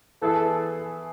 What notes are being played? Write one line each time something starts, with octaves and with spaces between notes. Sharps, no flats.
E3 B3 E4 G#4 A4